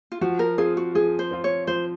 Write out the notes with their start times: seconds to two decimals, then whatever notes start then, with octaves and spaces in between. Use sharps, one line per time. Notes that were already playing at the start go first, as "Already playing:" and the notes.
0.12 F4
0.21 F3 F#4
0.39 A#4
0.58 C4 F4 G#4
0.77 F#4
0.95 F3 G#4
1.19 C5
1.31 C4 F4
1.44 C#5
1.67 F3 C5